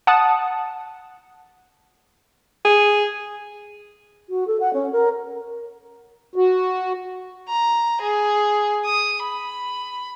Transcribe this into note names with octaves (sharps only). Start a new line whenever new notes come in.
F#5 A5 D#6
G#4
F#4
A4
F#5
C#4
A#4
F#4
A#5
G#4
D#6
B5